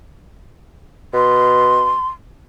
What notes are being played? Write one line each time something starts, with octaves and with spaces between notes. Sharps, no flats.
B2 C6